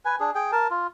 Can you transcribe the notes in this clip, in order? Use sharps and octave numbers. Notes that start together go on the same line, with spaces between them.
B4 G#5
D4 G#4
G#4 G5
A#4 A5
F4